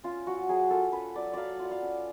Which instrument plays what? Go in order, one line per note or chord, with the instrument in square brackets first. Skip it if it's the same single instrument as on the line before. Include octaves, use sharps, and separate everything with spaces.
[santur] C#4 F4
F#3 F#4
F#3 G#4
F4 A4
C#4 B4
F#3 D5
F#3 D5 F5
F4
F#5
F5
C#4